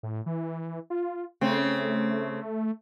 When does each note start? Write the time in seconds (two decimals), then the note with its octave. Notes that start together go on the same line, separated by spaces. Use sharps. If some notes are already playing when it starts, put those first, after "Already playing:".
0.03 A2
0.26 E3
0.90 F4
1.41 C#3 A3 C4